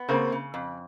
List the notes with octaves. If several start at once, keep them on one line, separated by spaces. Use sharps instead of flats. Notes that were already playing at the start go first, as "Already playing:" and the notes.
Already playing: B3
C#3 A#3 C4
C#3
F2